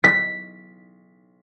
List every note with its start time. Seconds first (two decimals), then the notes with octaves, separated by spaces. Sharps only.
0.04 B6